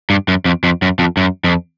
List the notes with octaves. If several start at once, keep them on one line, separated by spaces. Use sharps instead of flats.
G2
F#2
F2
F2
F#2
F2
F#2
F2